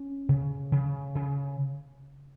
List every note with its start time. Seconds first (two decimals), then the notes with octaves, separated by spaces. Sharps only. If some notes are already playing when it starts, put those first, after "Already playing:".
Already playing: C#4
0.29 C#3
0.72 C#3
1.15 C#3